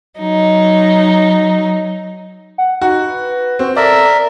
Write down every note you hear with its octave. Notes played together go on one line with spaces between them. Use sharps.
F#3 D#4
F#5
D#4 F#4
B4
C4 F#4
A4 A#4 D5 E5